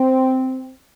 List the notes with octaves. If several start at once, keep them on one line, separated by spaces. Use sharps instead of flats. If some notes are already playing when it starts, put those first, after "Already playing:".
Already playing: C4